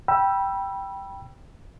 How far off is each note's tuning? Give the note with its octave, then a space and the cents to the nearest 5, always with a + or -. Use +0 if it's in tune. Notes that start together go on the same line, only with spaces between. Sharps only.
G5 +0 B5 -25 E6 +15